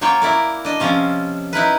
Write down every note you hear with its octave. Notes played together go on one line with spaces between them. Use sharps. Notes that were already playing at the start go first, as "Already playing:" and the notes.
F#3 A#3 F4 C#5 G5
E4 A#4 D5
D4 D#5
C3 F3 C#4 F4
D#4 E4 A#4 B4